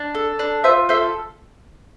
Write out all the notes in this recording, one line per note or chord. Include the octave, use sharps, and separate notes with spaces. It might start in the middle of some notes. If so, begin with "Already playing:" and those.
Already playing: D4
A4
D4
F4 C5 E5
A4 C5 E5